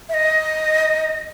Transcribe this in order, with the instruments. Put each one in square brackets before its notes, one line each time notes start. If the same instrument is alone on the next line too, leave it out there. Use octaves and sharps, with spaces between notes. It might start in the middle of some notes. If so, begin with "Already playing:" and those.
[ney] E5
D#5